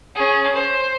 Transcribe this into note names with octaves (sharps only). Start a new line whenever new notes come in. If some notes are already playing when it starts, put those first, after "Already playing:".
C#4 G#4
C5